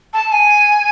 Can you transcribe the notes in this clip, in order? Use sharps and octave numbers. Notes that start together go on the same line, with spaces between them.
A5
G#5